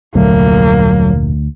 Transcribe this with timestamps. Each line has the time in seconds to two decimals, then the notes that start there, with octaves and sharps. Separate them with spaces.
0.15 F1 D2 A#2 F#3 A3 A#3